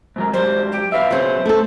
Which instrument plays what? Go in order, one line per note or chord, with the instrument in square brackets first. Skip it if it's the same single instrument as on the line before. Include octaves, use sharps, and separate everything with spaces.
[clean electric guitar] G#2 F#3 A#4
[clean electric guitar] G#2 F#3 G3 [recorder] C5
[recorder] G4
[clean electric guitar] B1 B4 E5 [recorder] F5
[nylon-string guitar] C#3 F#3 [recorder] C5
[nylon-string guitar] A3 A4